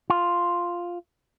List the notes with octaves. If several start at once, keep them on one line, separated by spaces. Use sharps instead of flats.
F4